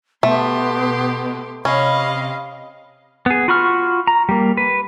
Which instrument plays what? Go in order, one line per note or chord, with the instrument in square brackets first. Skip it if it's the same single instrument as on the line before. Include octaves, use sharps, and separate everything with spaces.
[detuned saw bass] B2 [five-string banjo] A3 [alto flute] B3 [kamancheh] G4 C6
[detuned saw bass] C3 [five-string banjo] C#4 [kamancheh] D#5 F5 [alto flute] B5
[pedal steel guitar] B3 G#4
F4 F#4 B5 C#6 F6
A#5
G3 A#3
B4